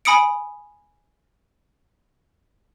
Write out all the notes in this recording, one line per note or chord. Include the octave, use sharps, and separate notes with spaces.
G#5 B5 D#6 C#7 D7